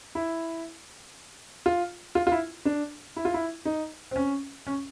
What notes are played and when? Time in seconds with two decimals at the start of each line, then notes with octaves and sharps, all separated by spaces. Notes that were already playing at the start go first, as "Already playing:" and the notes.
0.15 E4
1.66 F4
2.15 F4
2.27 F4
2.32 E4
2.65 D4
3.16 E4
3.25 F4
3.34 E4
3.65 D#4
4.11 C4
4.16 C#4
4.67 C#4